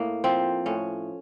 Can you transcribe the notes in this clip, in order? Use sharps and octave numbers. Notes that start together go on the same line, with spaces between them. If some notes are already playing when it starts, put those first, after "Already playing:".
Already playing: A2 A#3
F3 C4
A2 C#4